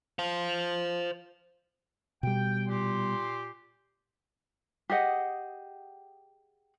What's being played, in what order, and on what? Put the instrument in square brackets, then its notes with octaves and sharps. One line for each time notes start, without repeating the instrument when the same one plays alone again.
[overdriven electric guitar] C5 F5
[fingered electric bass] B2 G3 [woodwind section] G5
[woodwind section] A#2 G4 C6
[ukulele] G4 G#4 D#5 F#5